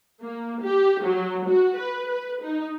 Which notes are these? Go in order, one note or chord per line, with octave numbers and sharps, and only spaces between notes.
A#3
G4
F#3
F#4
B4
B4
D#4